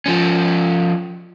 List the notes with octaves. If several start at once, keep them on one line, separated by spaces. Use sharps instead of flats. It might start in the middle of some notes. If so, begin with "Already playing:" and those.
F3 C#4